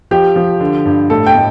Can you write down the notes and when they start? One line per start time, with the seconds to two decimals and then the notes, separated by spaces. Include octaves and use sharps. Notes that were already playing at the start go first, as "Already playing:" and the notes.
0.11 F3 G4
0.36 F3
0.60 D3
0.86 G2
1.10 A2 A4
1.26 G5
1.35 A2